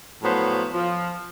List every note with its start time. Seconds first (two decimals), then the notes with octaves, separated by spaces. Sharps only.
0.23 A2 F3 F#3 B3 C5
0.73 F3